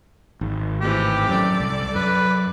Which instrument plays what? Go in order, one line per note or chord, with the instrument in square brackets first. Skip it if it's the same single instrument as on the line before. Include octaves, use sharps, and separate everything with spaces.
[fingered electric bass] G#1
[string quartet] A2 C3 E3 [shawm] G4
[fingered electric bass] F#2 [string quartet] A4 D5
[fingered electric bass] C2
[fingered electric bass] F#2 [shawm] B4